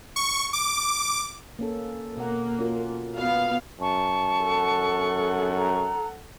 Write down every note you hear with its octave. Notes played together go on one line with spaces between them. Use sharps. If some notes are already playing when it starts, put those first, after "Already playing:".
C#6
D6
A#3 C#4 A4
B2 A#3 A#4 F#5
C#4 F4 F#4
B3 F#4 F5
F#2 A5 C#6
A4 F#5
A#5